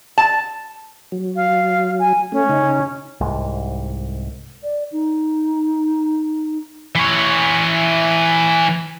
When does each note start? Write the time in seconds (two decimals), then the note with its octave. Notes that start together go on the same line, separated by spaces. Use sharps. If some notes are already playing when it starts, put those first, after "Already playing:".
0.18 A5
1.12 F#3
1.36 F5
1.99 G#5
2.32 A3 C#4
2.49 C#3 D#4
3.21 C2 G#2
4.63 D5
4.92 D#4
6.95 E3 C#5